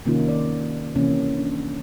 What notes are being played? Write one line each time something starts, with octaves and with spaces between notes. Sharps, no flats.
C3 D#3 A#3 C#4 D#4 F4
D5
C3 E3 A#3 C4 C#4
D4